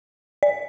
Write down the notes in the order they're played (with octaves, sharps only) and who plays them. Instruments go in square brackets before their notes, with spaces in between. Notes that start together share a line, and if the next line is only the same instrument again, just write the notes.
[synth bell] D5